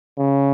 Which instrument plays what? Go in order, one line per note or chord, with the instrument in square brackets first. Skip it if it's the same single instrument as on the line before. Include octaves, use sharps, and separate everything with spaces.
[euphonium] C#3